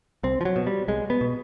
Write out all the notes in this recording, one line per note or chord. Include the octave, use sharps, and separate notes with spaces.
C2 C4
F3
F#3
B2
G3
C2 G#3
B3
B2